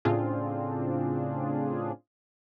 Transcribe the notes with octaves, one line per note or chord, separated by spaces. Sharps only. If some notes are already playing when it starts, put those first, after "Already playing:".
A2 C#3 C4 D4 F4 G#4